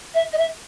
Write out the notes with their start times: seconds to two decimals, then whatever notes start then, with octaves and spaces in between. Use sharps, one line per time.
0.14 E5
0.32 D#5
0.37 E5